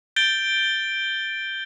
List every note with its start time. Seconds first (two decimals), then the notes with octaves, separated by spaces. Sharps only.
0.16 G6 A6 D7 G7